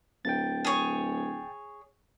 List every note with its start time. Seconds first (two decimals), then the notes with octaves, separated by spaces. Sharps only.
0.25 D1 G5 A6
0.65 G#4 C#5